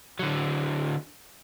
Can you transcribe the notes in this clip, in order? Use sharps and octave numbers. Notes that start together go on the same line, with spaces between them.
D3 F#3